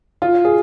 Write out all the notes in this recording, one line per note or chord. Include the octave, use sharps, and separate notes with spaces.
F4
G#4